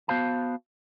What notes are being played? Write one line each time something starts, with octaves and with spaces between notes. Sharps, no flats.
B3 F#4 C5 F5 A5